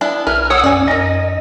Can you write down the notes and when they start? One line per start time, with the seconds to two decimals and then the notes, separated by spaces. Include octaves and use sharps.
0.01 B3 D4 E4
0.27 B1 E4 A#4 B4 F6
0.50 C#5 F#5 D#6 E6
0.64 F#2 C#4 D5 G#5
0.88 F#2 D#4 A#4 D#5